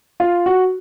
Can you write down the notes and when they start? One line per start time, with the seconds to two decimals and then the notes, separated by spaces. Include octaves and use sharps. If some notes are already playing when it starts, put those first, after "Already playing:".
0.20 F4
0.46 F#4